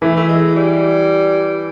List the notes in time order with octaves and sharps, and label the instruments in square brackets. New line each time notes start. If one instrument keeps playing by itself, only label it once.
[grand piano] E3 [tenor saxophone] A3
[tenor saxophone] A3
G#3
G3